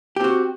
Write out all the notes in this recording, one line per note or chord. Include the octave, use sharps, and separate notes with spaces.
C4 F#4 G4